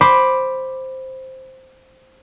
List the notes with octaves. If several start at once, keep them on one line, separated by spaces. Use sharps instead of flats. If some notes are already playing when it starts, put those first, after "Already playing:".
C5 B5 D6